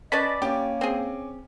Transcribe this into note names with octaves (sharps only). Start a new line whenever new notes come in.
C#4 B4 D5 D#5 A5 B5
A#3 C#4 G4 D6
C4 G#4